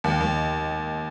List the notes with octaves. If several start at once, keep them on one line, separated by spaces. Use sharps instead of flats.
D#2
D#2